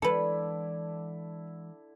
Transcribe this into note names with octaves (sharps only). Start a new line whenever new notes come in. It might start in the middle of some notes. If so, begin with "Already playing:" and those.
D3 E3 G#3 E4 A4 B4 D5